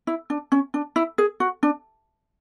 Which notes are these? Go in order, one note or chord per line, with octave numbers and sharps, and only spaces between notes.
E4
D4
C#4
D4
E4
G#4
F#4
D4